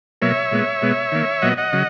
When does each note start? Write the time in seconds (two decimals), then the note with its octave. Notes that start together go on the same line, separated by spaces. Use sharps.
0.22 B2 F#3 A#3 C#5 E5
0.52 A#2 G#3 B3
0.82 B2 G#3 B3
1.12 D#3 A#3
1.42 A#2 F#3 B3 D#5 F#5
1.57 D#5 F#5
1.73 C#3 F#3